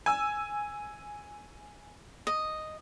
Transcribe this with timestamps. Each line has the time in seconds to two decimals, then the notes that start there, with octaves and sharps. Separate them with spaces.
0.06 G#5 E6
2.27 D#5